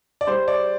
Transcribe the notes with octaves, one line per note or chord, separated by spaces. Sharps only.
D5
G3 C5
D5